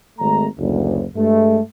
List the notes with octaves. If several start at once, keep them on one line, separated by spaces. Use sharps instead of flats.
G#1 A3 A#5
F#1 D2
G2 G#3 A3